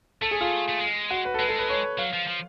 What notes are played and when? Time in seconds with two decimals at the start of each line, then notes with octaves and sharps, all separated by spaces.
0.21 A3 A4
0.31 G#4
0.41 F4
0.69 A3
0.80 G#3
1.10 F#4
1.25 B4
1.34 A4
1.39 G#3 B4
1.49 A4
1.59 B4
1.69 C#5
1.98 F#3 F5
2.13 F3
2.28 F3